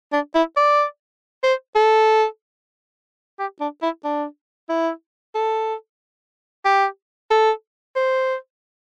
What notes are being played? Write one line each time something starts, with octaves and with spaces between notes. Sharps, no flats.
D4
E4
D5
C5
A4
G4
D4
E4
D4
E4
A4
G4
A4
C5